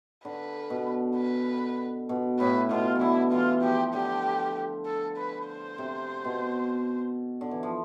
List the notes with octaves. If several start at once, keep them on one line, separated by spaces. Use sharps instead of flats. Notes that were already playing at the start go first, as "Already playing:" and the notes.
D3 B4
B2
B4
B2
A2 B4
B2 F4
E3
D3 E4
E3 F4
F3 G4
D3 G4
A4
B4
C5
C3
B2
D3
E3
F3